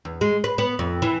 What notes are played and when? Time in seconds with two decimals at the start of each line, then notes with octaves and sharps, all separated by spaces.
0.05 E2
0.21 G#3
0.44 B4
0.58 B3
0.79 F2
1.02 E3